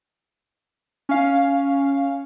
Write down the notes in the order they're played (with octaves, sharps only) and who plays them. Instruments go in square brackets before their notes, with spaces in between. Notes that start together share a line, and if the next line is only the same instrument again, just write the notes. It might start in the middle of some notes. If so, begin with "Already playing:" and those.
[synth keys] C#4 F5